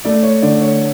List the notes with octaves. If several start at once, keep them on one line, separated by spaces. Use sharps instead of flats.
A3 D5
C#5
D3 D5
C#5